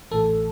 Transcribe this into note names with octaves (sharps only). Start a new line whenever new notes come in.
A1 A2 E3 A4